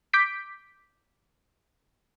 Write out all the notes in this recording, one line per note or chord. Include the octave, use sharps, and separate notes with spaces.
D6 G6 B6 D7